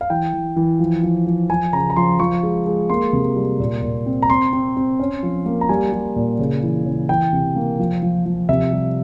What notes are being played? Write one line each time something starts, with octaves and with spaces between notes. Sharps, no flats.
F5
E3 G5
E3
E3
F3
F3
F3
F3 G#5
C#3 A#5
A#5
F3 C6
F3 C#6
G#3
G#3
A#3 C6
C3
G3
A#2
A#2
C4
A#5
C4 C6
C4
C4
C#4
F3
A#3
A#5
G3 G#5
G3
A#2
C#3
E3
C#3
E3 G5
C3
A#3
F3
F3
F3
C3 E5
G3